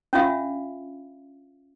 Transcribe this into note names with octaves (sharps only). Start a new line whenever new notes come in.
C#4 D4 F4 E5 F5